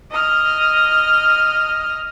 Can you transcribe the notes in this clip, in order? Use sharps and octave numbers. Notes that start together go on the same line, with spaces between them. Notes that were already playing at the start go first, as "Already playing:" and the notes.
D#5 F6